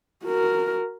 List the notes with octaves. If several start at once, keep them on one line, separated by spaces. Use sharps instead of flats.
F#4 A#4